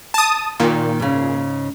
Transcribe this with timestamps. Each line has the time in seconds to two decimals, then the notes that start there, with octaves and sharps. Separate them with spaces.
0.14 A5 D#6
0.60 A#2 D#3
1.00 G#2 C#3